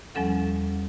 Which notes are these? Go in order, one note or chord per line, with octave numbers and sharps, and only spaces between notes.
E2 F3 G3 C#4 A4 F#5